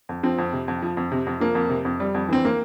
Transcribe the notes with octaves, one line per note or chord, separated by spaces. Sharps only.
F2
F3 C4
F2
C3
F2
F3
F2
C3
F2
F3 A#3
F2
C3
F2
G3
F2
E3 C4
A#3